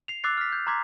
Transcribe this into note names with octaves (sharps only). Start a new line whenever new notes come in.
C7 F7
D6 E6 F#6 A6 C7
F6 B6
G6
A#5 C6 D6 G#6 B6